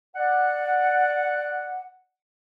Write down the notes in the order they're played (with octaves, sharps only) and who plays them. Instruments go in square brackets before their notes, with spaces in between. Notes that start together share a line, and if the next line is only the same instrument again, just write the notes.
[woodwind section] D5 F#5